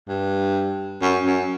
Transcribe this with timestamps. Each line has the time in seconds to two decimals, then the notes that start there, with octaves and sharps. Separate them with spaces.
0.07 G2
1.01 F#2
1.25 F#2